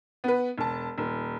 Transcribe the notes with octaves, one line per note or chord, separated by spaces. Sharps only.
B3 B4
E1 A5
D#1